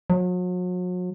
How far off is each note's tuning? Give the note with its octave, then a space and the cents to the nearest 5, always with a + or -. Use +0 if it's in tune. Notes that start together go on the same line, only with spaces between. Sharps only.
F#3 -40